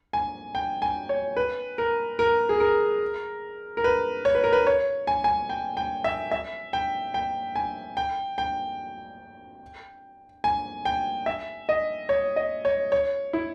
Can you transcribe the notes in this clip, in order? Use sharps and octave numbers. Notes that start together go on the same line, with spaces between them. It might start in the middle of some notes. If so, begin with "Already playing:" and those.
G#5
G5
G#5
C#5
B4
A#4
A#4
G#4
A#4
A#4
B4
C#5
B4
A#4
B4
C#5
G#5
G#5
G5
G5
E5
E5
G5
G5
G#5
G5
G5
G#5
G5
E5
D#5
C#5
D#5
C#5
C#5
E4